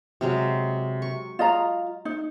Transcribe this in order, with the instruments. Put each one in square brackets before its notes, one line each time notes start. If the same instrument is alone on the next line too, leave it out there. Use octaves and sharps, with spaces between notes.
[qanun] C3 F#3 G#3
C#6
[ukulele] F4 D#5 A#5
D#4